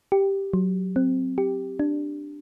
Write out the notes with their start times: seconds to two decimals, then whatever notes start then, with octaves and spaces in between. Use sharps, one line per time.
0.12 G4
0.53 F#3
0.96 C4
1.38 G4
1.79 D4